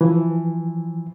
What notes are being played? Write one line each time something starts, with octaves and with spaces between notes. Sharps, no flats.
E3 F3